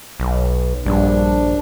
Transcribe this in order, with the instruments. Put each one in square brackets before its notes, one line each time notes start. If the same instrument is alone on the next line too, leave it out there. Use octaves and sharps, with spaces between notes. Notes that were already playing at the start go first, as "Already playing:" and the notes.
[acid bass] B1
[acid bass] A#1 [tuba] G2 [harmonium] D4